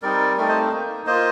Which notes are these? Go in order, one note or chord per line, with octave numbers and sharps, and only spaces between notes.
G3 C4 D#4 A#4 D5
A3 C4 D#4 A#4 D5
C5 D#5
A#3 D#4
A#3 F4 C5 D#5